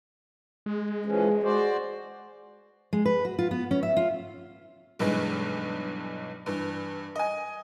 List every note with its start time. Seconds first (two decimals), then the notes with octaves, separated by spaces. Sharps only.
0.66 G#3
1.06 E3 F3 C#4 G#4
1.43 F#4 C5 D5
2.93 G#3
3.06 B4
3.25 F#4
3.39 F4
3.51 B3
3.71 C#4
3.83 E5
3.97 F4
4.99 B1 G2 E3 G#3
6.46 G2 E3
7.16 D#5 G#5